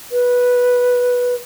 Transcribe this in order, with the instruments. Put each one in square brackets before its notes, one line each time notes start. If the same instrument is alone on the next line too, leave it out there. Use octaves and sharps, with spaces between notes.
[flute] B4